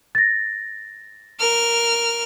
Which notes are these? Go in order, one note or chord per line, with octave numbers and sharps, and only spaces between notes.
A6 A#6
A#4 F6